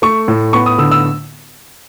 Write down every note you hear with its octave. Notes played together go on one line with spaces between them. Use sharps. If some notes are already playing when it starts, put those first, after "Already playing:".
A3 C#6
A2
B3 C#6
D#6
D3 E6
E6